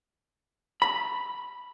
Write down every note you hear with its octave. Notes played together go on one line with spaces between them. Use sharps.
B5